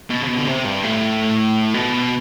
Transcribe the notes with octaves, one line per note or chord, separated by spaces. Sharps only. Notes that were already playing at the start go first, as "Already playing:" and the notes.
B2
C3
B2
D3
C3
G2
A2
B2